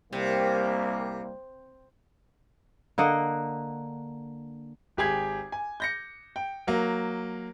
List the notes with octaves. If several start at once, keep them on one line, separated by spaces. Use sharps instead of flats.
C2 C3 G3 A#3
D3 A#3 D#5 F#5
G#1 G4 G#4 G#6
G#5
G6 A#6 C#7
G5
F#3 A#3